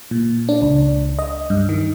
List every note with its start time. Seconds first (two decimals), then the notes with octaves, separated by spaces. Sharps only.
0.11 A#2
0.49 D4
0.62 C#2
1.19 D#5
1.50 G2
1.69 D#3